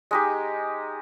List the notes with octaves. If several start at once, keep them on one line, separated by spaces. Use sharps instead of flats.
G#3 D#4 G4